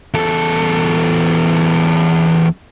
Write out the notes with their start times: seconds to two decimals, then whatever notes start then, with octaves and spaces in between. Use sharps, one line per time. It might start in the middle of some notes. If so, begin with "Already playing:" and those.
0.14 E2 A4